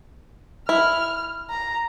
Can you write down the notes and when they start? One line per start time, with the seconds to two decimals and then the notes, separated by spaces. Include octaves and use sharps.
0.69 E4 F6
1.50 A#5